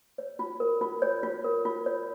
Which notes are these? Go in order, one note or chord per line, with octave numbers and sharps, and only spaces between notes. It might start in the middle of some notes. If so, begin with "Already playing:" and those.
C#5
F4
A#4
F4
C#5
F4
A#4
F4
C#5